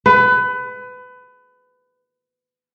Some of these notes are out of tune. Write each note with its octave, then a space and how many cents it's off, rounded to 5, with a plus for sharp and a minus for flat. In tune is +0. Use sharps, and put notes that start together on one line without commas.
B4 +25